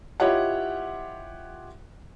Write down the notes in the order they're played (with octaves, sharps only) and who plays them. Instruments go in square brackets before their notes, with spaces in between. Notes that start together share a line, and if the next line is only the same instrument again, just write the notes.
[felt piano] E4 F4 G4 C#5 D#5 F#5